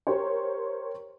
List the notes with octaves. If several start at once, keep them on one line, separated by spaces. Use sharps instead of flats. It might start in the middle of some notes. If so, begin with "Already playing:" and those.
G4 A#4 C5 C#5